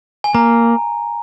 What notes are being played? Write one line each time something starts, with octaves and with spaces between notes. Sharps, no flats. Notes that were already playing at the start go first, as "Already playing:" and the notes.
G#5
A#3 A#5